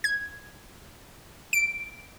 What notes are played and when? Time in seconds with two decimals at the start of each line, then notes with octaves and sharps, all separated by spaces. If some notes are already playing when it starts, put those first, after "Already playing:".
0.04 G#6
1.53 D7